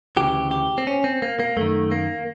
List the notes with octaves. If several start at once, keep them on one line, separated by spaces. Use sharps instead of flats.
D2 C#3 E3 G4
G4
C4
C#4
C4
A#3
A#3
F#2 D#3 A3
A#3